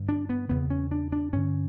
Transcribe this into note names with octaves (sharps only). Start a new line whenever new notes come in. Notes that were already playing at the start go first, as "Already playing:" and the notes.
Already playing: G2 D3
D4
B3
E2 C#3 B3
C#4
D4
D4
G2 D3 C#4